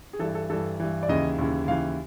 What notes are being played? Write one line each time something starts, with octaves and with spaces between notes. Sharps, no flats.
G#4
G2 E3 A4
A4
G2 E3 A4
G2 E3
D5
D#2 C#3 E3 D#5
D#2 C#3 E3
D#2 C#3 E3 F5